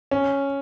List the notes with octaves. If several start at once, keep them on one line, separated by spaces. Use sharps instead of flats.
C#4